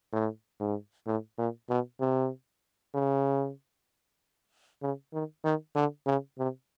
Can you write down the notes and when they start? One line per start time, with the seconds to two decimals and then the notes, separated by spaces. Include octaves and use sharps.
0.13 A2
0.60 G#2
1.07 A2
1.38 A#2
1.69 B2
2.00 C3
2.95 C#3
4.82 C#3
5.13 D#3
5.45 D#3
5.76 D3
6.06 C#3
6.38 C3